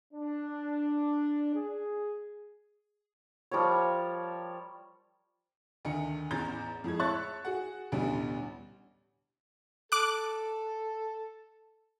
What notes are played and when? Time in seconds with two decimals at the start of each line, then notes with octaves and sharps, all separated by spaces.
0.13 D4
1.55 G#4
3.51 F3 G3 A#4 C#5
5.85 D2 D#3 D#4 C#7
6.31 A1 E2 A#5 G6 A6
6.84 F2 A2 G#3 G#6
6.99 C#5 E5 A5 C#6 F#6 A6
7.45 F#4 G#4 F#5
7.92 A1 D2 B2 G3
9.92 A4 D6 F#6